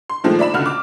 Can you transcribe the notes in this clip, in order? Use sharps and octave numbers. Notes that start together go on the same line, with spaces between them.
C6
A#2 D#3 F3 G#3 A3
D5 E5 B5 E7
C#2 D3 F#4 F6
D6